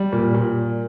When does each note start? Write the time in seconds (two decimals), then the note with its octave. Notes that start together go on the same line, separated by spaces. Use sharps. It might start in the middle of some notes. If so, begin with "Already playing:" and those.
Already playing: G3
0.13 A#2
0.34 A#2